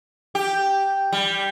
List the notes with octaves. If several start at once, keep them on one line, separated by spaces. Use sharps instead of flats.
G4
G3